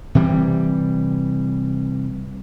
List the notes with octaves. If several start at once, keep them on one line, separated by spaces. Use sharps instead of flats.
C3 E3 G3